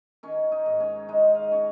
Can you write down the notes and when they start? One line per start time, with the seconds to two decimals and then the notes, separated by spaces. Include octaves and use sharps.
0.23 D#3 C#4 C#5
0.52 D#4 D#5
0.66 G#2
0.80 C#4 C#5
1.09 G#3 D#4 D#5
1.34 F5
1.43 D#5
1.51 C#4 C#5